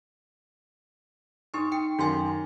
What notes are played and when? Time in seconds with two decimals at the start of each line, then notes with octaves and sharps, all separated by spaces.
1.54 D#4 C6 C#6 D#6
1.72 G5 C#7
1.99 F#2 D#3 C#4 G#5 C6 A6